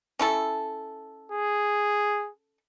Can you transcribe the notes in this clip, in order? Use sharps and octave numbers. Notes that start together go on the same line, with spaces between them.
C#4 E4 A4
G#4